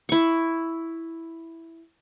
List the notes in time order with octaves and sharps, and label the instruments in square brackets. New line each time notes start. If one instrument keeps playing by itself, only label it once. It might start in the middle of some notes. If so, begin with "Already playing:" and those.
[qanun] E4 C#6